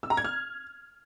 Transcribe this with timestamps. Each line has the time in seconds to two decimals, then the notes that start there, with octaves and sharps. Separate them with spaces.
0.03 E6
0.10 A#5
0.17 G#6
0.24 F6